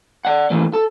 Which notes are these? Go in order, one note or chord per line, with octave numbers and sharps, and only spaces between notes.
D5 F#5
A2 E3 A#3
A4